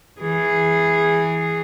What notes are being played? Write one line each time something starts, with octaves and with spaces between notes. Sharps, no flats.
E3 G#4